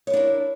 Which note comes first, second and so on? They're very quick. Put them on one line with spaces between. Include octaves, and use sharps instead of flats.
C#5 E4 D4 A#4